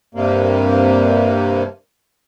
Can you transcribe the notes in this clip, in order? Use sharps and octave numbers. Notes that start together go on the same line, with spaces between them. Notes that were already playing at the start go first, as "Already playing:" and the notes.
G2 C3 A#3